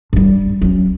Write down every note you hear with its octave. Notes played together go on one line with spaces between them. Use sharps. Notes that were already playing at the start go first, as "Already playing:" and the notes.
G2 G3
F#3 C#4